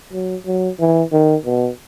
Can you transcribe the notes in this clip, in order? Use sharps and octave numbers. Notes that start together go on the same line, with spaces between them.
F#3
F#3
E3
D#3
B2